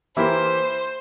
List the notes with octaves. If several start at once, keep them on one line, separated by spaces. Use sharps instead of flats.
E3 A#3 E4 G4 A#4 C5